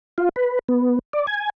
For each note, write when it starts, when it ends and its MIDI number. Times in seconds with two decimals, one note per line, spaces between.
0.18 0.29 65
0.36 0.59 71
0.69 0.99 59
1.13 1.26 74
1.27 1.50 80